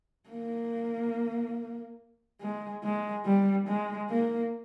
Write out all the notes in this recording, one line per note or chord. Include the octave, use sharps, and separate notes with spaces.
A#3
G#3
G#3
G3
G#3
A#3